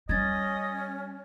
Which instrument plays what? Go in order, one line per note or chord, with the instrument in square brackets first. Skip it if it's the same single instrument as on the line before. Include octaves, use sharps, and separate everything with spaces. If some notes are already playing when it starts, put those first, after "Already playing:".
[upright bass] G3 [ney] C#4 [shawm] D#5 [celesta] G#6 A6